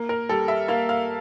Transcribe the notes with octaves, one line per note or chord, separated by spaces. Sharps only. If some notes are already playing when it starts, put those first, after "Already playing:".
Already playing: A#3
A#4
G3 A4
E5
A#3 F5
F5